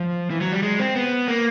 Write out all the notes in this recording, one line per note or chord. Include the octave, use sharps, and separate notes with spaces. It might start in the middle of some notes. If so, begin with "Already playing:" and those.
Already playing: F3
E3
F#3
G3
G#3
C4
B3
A#3